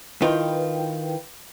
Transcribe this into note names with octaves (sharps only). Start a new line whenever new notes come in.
D#3 E4 F4 B4 G5